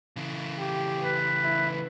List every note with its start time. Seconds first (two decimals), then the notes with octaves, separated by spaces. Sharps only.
0.16 C#3 E3
0.59 G4
1.01 B4
1.43 E4